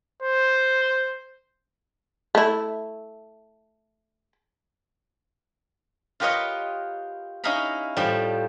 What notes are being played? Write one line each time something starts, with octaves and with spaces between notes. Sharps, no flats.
C5
A3 E4
F4 G4 A#4 B4 C#5 D#5
C#4 D#4 E4 F5 A#5 B5
A2 F3 G3 D5